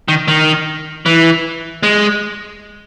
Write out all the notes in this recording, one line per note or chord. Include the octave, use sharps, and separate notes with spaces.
D#3
D#3
E3
G#3